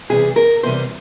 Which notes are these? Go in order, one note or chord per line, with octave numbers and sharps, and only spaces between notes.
E2 C3 E3 G3 G#4
A#4
E2 C3 E3 G3 C5